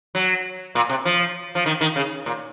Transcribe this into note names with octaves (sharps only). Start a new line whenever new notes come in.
F#3
A#2
C3
F3
F3
D#3
D#3
C#3
A#2